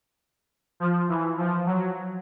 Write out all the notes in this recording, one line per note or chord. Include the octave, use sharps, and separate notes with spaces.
F3
E3
F3
F#3